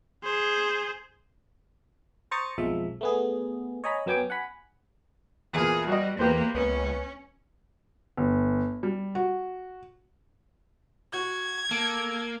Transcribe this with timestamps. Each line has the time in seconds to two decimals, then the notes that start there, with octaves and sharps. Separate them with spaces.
0.24 G#4 C5
2.31 C5 A#5 C#6 D#6 A6 C#7
2.58 B1 F2 F3 G#3 E5
3.01 A3 B3 G#4
3.84 C#5 D#5 G#5 A#5 B5
4.06 F#2 F#3 B3 G5 G#5 D6
4.30 F#5 G#5 B5
5.53 E2 A#2 G#4
5.88 G3 F#4 D#5
6.19 E2 A#3 G4 B4 C5
6.55 C#2 B3 C#4
8.18 G1
8.83 G3
9.15 F#4
11.13 F#4 G#6
11.71 A#3 A4